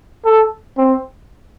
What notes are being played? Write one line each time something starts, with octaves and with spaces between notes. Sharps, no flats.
A4
C4